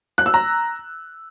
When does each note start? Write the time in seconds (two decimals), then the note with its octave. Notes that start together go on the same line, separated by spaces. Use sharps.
0.18 F#6
0.26 E6
0.34 A#5